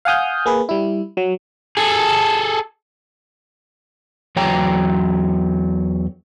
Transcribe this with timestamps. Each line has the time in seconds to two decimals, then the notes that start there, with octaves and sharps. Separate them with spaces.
0.05 F5 F#5 G#5 D#6 F6 G6
0.46 A#3 G#4 B4
0.69 G3 E4
1.17 F#3
1.77 G#4 A4
4.36 E2 F#3 C#5 G5 A#5